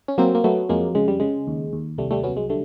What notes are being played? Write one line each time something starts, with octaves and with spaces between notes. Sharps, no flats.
C#4
F#3 A#3 C4
A#3
F#3 A3 B3
F2 G#3 A#3
C#3 G#3
G3
C#3 G#3
D#2
D#2
C2 G3 A3
G3 A3
F#3 B3 C#4
G#3
D3 G3 A3